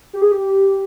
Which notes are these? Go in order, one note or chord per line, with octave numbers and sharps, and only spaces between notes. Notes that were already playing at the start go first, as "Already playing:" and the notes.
G4
G#4
G4